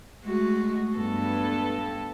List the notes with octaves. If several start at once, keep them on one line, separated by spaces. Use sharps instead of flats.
G#3 A3 F#4
G2 B3 A4